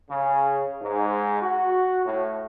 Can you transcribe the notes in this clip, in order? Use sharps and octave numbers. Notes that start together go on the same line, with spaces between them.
C#3
G#2
F#4
A2